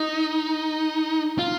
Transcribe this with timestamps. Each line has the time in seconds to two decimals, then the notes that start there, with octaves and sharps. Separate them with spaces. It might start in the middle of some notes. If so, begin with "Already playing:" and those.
Already playing: D#4
1.38 F4